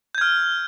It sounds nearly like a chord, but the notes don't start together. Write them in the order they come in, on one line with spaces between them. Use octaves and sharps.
G6 G#6 F6